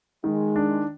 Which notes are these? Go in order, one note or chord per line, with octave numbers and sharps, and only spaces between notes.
D#3 G#3
D4